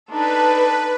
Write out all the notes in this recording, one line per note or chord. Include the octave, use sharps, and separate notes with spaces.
D4 D#4 A4 B4